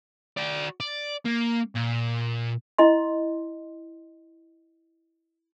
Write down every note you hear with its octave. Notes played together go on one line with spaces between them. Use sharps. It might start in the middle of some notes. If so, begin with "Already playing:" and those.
F#4 D5
D5
A#3
A#2
E4 D#5 C6